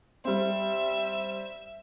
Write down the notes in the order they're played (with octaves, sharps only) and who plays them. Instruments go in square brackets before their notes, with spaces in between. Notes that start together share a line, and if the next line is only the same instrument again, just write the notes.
[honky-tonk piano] G3 C4 [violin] E5